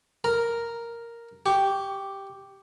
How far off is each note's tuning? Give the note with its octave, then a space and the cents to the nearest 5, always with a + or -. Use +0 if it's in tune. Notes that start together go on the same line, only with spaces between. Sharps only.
A#4 +0 A#5 +0
G4 +0 C#6 +30